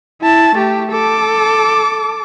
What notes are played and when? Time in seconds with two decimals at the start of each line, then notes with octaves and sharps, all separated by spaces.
0.23 E4 A5
0.56 A3 G4
0.91 A4 D6